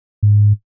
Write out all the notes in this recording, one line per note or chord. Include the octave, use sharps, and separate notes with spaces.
G#2